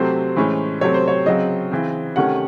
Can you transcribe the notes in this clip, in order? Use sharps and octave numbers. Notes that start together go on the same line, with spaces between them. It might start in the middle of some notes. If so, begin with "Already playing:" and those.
Already playing: C3 F#3 A3 C4 C5
A2 E3 G#3 C#4
C3 F#3 A3 C4 C#5
C5
C#5
C#3 F#3 C4 D#5
C#3 E3 C4
C3 D#3 A3 C#4 F#5